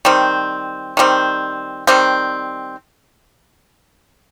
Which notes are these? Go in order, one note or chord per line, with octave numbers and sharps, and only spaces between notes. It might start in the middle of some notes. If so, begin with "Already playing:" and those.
D#3 G3 C4
D#3 G3 C4
D#3 G3 C4